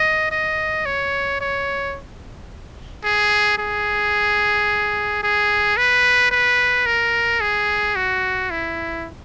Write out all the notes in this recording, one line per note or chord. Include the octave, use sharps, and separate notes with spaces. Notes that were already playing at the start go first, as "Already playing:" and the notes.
Already playing: D#5
D#5
C#5
C#5
G#4
G#4
G#4
B4
B4
A#4
G#4
F#4
E4